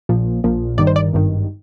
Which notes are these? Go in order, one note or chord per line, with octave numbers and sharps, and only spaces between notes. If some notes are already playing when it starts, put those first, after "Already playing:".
A#1 A#2 F3
A#1 A#2 F3
G1 G2 D#3 D5
C5
D5
G#1 G2 D#3